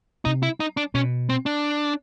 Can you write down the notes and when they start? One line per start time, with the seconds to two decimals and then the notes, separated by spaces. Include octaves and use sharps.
0.25 C3 D#4
0.43 E4
0.60 D#4
0.77 D4
0.94 B2 C#4
1.29 C4
1.46 D4